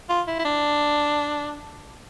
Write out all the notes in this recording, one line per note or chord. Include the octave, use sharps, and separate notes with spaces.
F4
E4
E4
D4